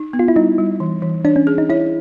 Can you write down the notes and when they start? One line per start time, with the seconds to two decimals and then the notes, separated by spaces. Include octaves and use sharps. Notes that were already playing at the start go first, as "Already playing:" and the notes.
Already playing: D#4
0.13 B3
0.19 F4
0.28 E4
0.36 G3 D#4
0.58 G3
0.80 E3
1.02 E3
1.25 D4 C#5
1.36 C#4
1.47 G#4
1.58 D#4
1.70 E4 C#5